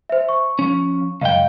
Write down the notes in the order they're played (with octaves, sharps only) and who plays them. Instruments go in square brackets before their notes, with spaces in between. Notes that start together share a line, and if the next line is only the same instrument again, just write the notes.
[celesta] C5 E5
C#6
[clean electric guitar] F3 C#4
[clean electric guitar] C#2 F#2 G5 [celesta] D#5 F5